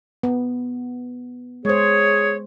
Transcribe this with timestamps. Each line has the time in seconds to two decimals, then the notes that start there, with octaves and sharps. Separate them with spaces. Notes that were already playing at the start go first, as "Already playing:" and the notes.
0.23 B3
1.65 G#3 G#4 C5 C#5